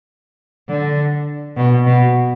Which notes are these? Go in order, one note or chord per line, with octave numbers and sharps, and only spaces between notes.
D3
B2
B2